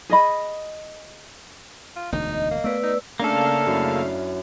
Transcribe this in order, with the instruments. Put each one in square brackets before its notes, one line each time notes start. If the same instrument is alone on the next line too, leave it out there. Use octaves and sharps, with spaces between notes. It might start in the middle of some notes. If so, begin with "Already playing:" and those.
[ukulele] G#4 D#5 B5
[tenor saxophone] F4
[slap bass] E1 D2 [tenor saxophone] D#4
[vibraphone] D#5
[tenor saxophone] A#3
[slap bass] A3 B3 [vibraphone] B4 D5 E6
[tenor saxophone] D#4
[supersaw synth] C#3 A3 F5 [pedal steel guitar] A#3 A4 [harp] D4
[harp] F#2 E4